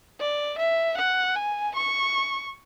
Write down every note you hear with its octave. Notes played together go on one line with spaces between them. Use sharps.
D5
E5
F#5
G#5
C#6